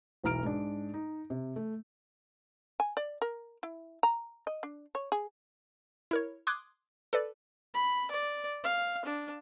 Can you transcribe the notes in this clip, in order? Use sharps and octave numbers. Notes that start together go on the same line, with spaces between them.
E1 B1 E4 A#5 F6 D7
G#2 D4
D#4
C3
A3
G#5
D5
A#4
E4
A#5
D#5
D4
C#5
G#4
E4 A#4 C#5
C6 D6 D#6 F#6 G#6
A4 B4 D5
B5
D5
F5
D4